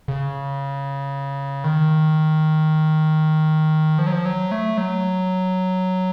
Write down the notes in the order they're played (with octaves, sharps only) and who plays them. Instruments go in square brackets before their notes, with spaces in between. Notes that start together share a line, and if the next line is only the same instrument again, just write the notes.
[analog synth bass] C#3
D#3
F3
F#3
F3
F#3
A3
F#3